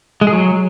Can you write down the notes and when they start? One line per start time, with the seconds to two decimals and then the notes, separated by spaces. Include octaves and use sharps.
0.21 G#3
0.27 G#4
0.32 F#3